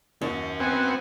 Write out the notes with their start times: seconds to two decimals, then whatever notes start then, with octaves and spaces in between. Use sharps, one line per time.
0.22 D#2 C#4 F#4
0.60 B3 C4 F#5 G#5